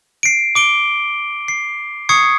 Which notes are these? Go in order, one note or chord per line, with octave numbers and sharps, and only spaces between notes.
C7 D7
D6 D7 G7
C7
C#6 D#6 G#6 C7 C#7